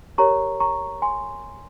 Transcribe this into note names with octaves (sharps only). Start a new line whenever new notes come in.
G4 A#4 C#5 A#5 C#6
A#5 C#6
G#5 C6